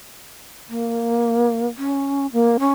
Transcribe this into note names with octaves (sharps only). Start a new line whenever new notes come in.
A#3
C#4
A#3
C#4